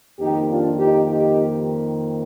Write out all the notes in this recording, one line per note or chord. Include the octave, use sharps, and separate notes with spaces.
F2 D#3 A#3 D#4 G4
D4 F4
D#4 G4
D#4 G4